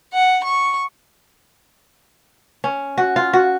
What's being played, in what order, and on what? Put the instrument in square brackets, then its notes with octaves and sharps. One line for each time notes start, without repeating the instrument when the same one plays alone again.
[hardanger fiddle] F#5
C#6
[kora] C#4
F#4
F4
F#4